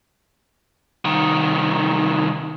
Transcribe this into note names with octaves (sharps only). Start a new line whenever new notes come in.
C2 D#3